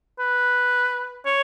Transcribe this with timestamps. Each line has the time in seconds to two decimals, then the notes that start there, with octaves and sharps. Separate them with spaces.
0.20 B4
1.26 C#5